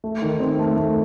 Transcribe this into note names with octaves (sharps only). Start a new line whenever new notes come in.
A3
D#3
C4
A3
A3